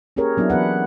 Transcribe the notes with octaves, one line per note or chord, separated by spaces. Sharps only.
A#3 C#4 G4 G#4 A#4 C#5
F#3 B3 D4 E4
E3 B3 B4 F#5